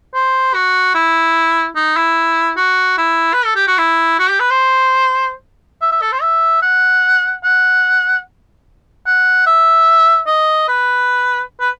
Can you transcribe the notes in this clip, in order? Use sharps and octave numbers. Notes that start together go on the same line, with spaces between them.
C5
F#4
E4
D#4
E4
F#4
E4
B4
A4
G4
F#4
E4
F#4
G4
B4
C5
E5
E5
A4
C5
E5
F#5
F#5
F#5
E5
D#5
B4
B4